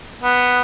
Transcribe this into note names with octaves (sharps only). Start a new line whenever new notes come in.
B3